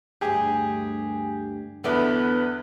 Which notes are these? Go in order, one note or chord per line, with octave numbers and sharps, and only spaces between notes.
D2 G2 G4 G#4
E2 D3 B3 D4 E4 B4